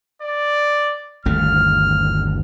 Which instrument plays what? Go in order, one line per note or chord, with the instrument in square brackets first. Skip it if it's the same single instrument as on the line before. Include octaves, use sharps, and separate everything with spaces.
[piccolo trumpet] D5
[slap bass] G1 D#2 A3 [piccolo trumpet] F6